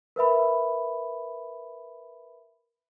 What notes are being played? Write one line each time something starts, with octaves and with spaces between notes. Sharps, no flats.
A#4 B4 E5 B5